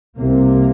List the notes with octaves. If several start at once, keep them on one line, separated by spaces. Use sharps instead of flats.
C2 C3 A#3